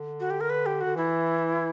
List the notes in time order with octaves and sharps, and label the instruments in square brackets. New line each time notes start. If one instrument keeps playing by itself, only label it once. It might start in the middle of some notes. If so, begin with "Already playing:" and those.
Already playing: [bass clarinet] D3
[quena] F#4
G4
A#4
B4
G4
[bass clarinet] D3 [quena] F#4
[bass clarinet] E3 [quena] E4